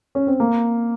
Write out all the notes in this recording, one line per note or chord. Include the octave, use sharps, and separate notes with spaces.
C#4
C4
A#3